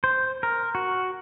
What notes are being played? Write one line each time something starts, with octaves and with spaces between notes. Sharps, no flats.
C5
A#4
F#4